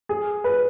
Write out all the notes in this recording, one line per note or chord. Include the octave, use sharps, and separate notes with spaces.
G#4
B4